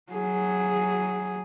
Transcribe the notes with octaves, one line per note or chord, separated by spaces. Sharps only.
F#3 G#4